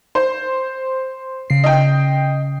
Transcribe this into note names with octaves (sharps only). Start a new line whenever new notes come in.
C5
C#3 C7
D#5 G5